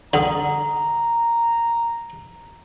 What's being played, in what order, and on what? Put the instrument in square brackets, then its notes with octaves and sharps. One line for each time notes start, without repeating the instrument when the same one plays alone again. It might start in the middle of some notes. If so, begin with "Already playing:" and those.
[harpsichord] D3 [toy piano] F#5 D#6 [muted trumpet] A#5